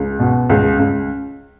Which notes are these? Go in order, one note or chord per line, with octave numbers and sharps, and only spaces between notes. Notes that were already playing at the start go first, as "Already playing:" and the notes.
Already playing: C#2
B2
C#2
C#2